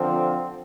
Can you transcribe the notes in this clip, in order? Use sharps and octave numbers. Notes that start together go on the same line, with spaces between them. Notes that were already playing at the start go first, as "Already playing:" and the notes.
Already playing: D3 F3 C4